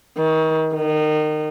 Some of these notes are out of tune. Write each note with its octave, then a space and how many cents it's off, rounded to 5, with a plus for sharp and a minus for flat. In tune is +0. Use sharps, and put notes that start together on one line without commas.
D#3 +30
D#3 -25